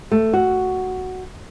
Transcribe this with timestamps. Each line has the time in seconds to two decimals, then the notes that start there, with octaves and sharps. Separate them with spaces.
0.12 A3
0.33 F#4